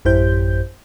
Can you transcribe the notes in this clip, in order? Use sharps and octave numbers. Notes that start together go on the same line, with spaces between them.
A1 F#2 E4 G4 C5 G6